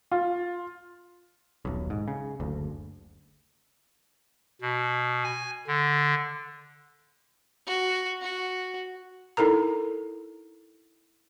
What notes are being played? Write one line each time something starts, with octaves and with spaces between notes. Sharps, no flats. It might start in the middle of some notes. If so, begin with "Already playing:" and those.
F4
D#1 B1
G#2
C#3
F#1 D2
B2
G#5
D3
F#4
F#4
D#4 E4 A4 A#4 A#5